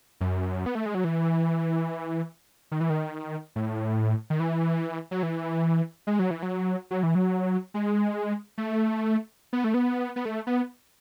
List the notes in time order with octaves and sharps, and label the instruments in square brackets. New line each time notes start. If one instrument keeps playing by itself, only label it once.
[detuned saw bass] F#2
B3
A3
G#3
F#3
E3
D#3
E3
D#3
A2
D#3
E3
F#3
E3
G#3
F#3
E3
F#3
F#3
E3
F#3
G#3
A3
B3
A3
B3
B3
A3
B3